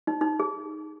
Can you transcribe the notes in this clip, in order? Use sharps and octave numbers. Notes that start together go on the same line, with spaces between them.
D#4
D#4
G#4